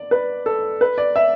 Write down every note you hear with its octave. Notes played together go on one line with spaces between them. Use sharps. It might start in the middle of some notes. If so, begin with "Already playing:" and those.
Already playing: D5
B4
A4
B4
D5
E5